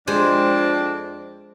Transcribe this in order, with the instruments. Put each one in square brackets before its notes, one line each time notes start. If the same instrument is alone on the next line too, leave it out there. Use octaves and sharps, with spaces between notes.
[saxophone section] F2 C4 D4 [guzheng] G#3 C5